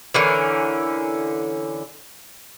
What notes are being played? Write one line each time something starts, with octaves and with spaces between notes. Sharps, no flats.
D3 E3 C#4 A#4